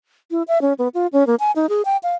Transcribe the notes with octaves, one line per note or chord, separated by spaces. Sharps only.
E4
E5
C#4
B3
F4
C#4
A#3
G#5
D#4
G#4
G5
F5